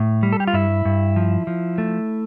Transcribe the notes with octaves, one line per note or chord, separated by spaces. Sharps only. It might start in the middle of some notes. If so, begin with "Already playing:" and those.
Already playing: A2
G3
A4
G4
F4
G2 E4
G2
F3
F3
A3